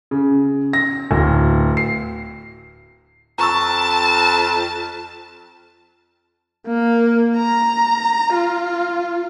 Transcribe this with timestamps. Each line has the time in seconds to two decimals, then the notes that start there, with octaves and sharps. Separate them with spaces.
0.11 C#3
0.73 A#6
1.11 D1
1.77 C7
3.38 F2 A5 A#5 C#6 E6
6.66 A#3
7.36 A#5
8.33 F4